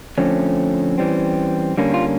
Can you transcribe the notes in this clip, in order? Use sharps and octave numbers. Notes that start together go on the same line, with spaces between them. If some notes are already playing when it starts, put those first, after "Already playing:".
D3 F3 A3 C4 C#4
E3 G3 C4
D3 G3 A#3 C#4
F4